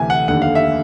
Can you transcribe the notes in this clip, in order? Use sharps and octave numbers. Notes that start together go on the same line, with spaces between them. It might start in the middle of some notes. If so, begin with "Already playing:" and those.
Already playing: D2 C3 E3 G#5
F#5
F1 D#2 D3 F#5
F5
E5